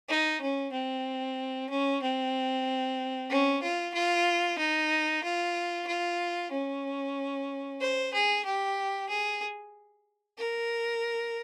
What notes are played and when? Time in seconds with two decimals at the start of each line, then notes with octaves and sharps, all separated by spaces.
0.08 D#4
0.41 C#4
0.72 C4
1.69 C#4
2.02 C4
3.30 C#4
3.63 F4
3.94 F4
4.58 D#4
5.24 F4
5.87 F4
6.51 C#4
7.81 C5
8.14 G#4
8.45 G4
9.09 G#4
10.38 A#4